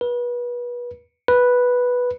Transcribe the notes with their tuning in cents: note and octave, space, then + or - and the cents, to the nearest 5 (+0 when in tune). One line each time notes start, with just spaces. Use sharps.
B4 -30
B4 -5